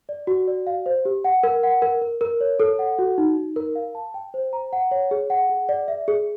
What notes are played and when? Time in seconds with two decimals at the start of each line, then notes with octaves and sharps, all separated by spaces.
0.09 D5
0.27 F#4
0.47 D5
0.67 F5
0.86 C5
1.05 G4
1.24 F#5
1.43 A#4
1.63 F#5
1.82 A#4
2.01 A#4
2.21 A#4
2.41 C#5
2.60 A4
2.79 F#5
2.99 F#4
3.18 D#4
3.37 D#4
3.56 A#4
3.75 F5
3.95 A5
4.14 G5
4.34 C5
4.53 A#5
4.73 F#5
4.91 C#5
5.11 G#4
5.30 F#5
5.50 G#4
5.69 D5
5.88 E5
6.08 G#4